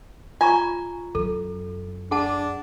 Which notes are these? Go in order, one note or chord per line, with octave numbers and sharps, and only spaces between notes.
F4 G#5 A#5 C#6
F#2 A4
D4 G#4 F#5 A5